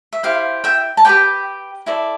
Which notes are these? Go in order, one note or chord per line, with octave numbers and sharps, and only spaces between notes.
E5
E4 G4 C5 F5
E5 G5
A5
G4 B4 D5 G5 B5
E4 A4 D5